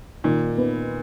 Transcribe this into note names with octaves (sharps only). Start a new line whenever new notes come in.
A#2 D#3
B3